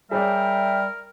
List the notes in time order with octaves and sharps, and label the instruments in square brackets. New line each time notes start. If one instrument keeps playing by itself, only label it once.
[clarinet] G3 [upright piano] G#4 C#5 D5 [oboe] A#4 [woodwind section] E5 G5